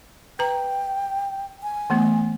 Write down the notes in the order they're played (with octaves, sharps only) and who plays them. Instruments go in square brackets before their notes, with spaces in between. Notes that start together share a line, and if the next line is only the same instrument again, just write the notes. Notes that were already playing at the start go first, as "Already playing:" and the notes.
[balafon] B4 A#5 [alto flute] G5
[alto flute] G#5
[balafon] E3 A3 B3